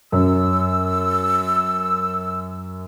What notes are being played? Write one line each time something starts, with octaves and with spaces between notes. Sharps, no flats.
F#2 E6